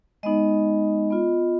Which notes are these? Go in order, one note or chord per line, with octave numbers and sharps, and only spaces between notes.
G#3 B3 D#4 D#5
B3 F4